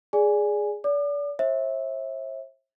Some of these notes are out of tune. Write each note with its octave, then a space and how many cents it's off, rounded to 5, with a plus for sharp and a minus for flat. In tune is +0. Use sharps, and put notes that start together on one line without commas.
G#4 +0 D5 -5 G#5 +0
D5 -30 D6 +40
C5 +45 E5 -15